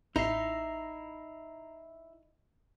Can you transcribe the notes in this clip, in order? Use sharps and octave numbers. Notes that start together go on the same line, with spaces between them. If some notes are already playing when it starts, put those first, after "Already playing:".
A1 D#4 E4 A#5 C7